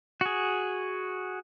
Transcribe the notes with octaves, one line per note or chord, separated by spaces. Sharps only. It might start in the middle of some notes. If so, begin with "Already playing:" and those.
F#4 G#4